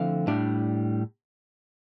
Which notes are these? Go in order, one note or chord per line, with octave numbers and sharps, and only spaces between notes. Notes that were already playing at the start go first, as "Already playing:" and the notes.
Already playing: D3 F3 A3 C4 E4 F5
A2 G3 D4